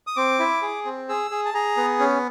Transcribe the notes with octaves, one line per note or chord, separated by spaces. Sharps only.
D#6
C4 D6
E4
G#4
C4
G#4 E6
G#4
A5
G#4 A#5
B3
C#4